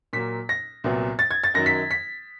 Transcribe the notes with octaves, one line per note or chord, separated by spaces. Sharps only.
A#2 F#3 A#3 B6
A#6
C2 A#2 F#3 B3
A6
G#6
A6
F#2 D#3 F#3 A#6
B6
B6